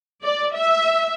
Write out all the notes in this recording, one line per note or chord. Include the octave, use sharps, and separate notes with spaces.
D5
E5